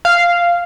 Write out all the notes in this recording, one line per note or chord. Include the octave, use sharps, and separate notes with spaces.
F5